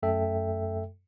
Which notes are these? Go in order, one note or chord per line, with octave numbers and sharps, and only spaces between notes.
F#2 A3 A4 E5 G5